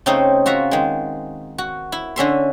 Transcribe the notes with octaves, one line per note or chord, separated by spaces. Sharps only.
C#3 A3 C4 D#4 C5
F4 F#4 E5 A#5
D#3 G#3
F#4
E4
D3 C#4 E5 C6